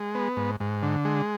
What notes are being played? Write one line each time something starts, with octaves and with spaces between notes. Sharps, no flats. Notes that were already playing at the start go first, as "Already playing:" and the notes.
Already playing: G#3
B3
G#2
G#2
D3
G#3